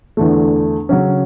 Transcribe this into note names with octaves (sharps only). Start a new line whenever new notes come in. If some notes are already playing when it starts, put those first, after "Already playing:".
E2 D3 A3
C#3 F#3 C#4